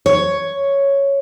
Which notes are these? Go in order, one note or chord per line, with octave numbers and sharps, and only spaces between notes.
C#5